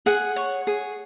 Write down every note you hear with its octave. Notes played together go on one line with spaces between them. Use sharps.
G#4 F#5
C#5
G#4